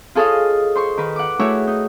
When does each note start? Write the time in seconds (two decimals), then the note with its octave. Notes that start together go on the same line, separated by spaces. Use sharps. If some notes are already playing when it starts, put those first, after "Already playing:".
0.15 F4 G#4 A4 C#5 D#5 F5
0.75 C5 C6 C#6
0.97 D#3 B4
1.16 F#5 D6
1.39 A3 E4 F#4 G#4 C#5 E5
1.67 D#4